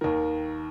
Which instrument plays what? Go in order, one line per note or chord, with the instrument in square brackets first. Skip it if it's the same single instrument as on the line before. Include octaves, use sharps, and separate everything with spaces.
[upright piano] D#2 D#3 A#4